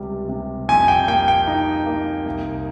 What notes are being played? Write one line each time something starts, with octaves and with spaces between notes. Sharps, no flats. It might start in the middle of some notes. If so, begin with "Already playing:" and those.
Already playing: C#2 C3 G3
C3
F2 G#5
G5
A#3 G5
G5
D#4
A#3
C2